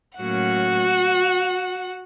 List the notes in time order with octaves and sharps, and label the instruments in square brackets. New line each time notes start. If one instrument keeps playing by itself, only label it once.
[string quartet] A2 F#3 A#3 C#4 F#4 F#5